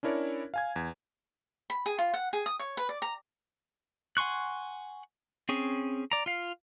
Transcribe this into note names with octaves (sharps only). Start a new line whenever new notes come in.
C#4 D4 E4 A#4 C#5 D5
F5 G#5 G#6
E2
B5
G#4
F4
F#5
G#4
D#6
C#5
B4
D5
A#5
F#5 G#5 C6 C#6 F#6
C4 C#4 G#4
D5 A#5
F4 F5